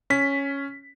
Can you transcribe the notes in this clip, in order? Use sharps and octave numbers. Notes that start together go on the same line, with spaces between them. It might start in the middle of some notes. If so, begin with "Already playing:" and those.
C#4 B6